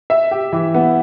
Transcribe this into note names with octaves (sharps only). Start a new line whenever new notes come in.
E5
G4
E3
B3